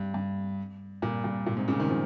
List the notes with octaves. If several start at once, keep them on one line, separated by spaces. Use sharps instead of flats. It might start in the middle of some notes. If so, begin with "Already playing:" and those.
Already playing: G2
G2
G2 A#2
G2 A#2
G2 A#2
G#2 C3
A#2 C#3
C3 D#3
C#3 F3